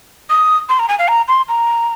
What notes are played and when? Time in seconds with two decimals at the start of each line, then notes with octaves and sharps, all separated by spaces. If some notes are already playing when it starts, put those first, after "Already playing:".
0.30 D#6
0.69 C6
0.79 A#5
0.89 G#5
0.99 F5
1.08 A#5
1.28 C6
1.49 A#5